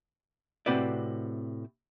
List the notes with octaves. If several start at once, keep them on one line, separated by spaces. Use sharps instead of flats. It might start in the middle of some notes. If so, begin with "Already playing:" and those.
A2 C3 C4 F#4 B4 D5